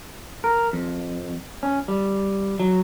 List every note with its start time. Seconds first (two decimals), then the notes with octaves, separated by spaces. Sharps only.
0.44 A#4
0.73 F2
1.63 C#4
1.88 G3
2.60 F#3